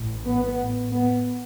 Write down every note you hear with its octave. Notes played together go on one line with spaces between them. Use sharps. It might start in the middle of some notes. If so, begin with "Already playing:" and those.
Already playing: A1 A2
B3
B3